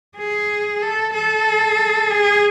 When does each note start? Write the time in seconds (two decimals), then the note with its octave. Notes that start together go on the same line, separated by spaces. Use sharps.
0.17 G#4
0.82 A4
1.14 A4
2.11 G#4